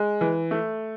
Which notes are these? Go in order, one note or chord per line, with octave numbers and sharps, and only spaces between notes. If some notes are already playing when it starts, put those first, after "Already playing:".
Already playing: G#3
E3
A3